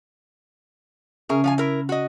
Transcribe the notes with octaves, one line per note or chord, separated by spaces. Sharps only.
C#3 C#4 G#4 A#4 E5
F3 F5 G#5
E4 A#4
F#4 D#5